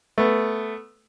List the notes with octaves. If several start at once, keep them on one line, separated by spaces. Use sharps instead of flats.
A3 B3